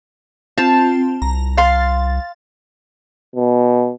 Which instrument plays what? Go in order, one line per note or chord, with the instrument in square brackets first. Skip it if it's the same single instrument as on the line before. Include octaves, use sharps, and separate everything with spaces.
[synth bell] C4 F4 [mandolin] A5
[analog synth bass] C2 [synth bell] A#5
[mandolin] F5 C6 [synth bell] A6
[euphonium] B2